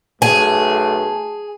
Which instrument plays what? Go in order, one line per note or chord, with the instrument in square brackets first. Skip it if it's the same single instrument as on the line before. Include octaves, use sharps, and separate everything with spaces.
[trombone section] B1 A3 [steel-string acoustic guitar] G#4 [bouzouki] G#5 [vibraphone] A5